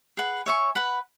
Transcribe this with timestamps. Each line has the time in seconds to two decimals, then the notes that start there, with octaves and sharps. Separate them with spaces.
0.17 G#4 B4 F#5
0.46 C#5 E5 G#5 C#6
0.75 B4 F#5 B5